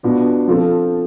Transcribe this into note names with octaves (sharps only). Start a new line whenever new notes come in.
B2 B3 D4 F4
F3 C4 F4 A4